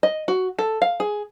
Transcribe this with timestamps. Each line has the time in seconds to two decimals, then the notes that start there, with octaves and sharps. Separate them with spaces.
0.03 D#5
0.28 F#4
0.59 A4
0.82 F5
1.00 G#4